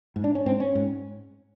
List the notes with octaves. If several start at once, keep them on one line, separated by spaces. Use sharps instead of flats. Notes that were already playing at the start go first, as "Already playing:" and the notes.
G#2
D4
C#4
G#2 C4
C#4
G#2